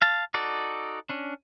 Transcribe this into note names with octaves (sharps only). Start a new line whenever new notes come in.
F5 A5
D#4 F#4 A4 D5
C#4 D4